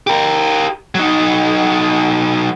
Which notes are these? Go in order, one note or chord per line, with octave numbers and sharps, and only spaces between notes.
G4 A#4
F#3 D#4